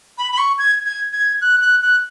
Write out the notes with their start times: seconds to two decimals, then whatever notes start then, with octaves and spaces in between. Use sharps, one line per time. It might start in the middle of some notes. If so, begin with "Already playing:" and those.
0.18 B5
0.32 B5
0.38 C#6
0.58 G#6
0.86 G#6
1.13 G#6
1.42 F#6
1.61 F#6
1.82 F#6